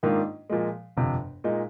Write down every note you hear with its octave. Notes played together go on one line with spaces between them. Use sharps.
G#2 D#3 A#3 D4 F4
A#2 F3 G#3
G1 F2 C3
A#2 G#3 D#4